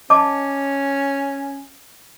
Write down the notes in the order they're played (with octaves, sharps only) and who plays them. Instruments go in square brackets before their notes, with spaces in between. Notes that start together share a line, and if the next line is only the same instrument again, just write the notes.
[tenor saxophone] C#4 [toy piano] D#5 A5 D6